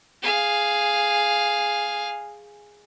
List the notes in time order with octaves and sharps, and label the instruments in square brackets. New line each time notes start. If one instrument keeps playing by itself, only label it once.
[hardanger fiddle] G#4 F5